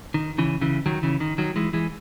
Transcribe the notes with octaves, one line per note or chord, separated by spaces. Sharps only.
D#3
C#3 E3
C#3 E3
D#3 F#3
C#3 E3
D#3
D#3 F#3
E3 G#3
E3 G#3